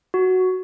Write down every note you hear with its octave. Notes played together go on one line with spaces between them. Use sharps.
F#4